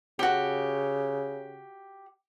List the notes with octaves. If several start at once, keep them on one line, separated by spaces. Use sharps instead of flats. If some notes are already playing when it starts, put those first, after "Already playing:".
C#3 F#4 G4